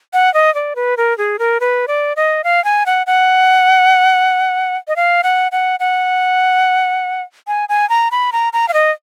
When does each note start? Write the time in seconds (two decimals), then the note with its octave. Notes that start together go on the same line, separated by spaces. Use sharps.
0.13 F#5
0.34 D#5
0.55 D5
0.76 B4
0.97 A#4
1.18 G#4
1.39 A#4
1.60 B4
1.88 D5
2.16 D#5
2.44 F5
2.64 G#5
2.86 F#5
3.07 F#5
4.88 D#5
4.96 F5
5.24 F#5
5.52 F#5
5.80 F#5
7.47 G#5
7.69 G#5
7.90 A#5
8.11 B5
8.32 A#5
8.53 A#5
8.68 F5
8.74 D#5